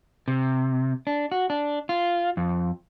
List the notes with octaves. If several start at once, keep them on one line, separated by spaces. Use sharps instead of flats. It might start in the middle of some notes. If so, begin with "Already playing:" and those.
C3
D4
F#4
D4
F4
F2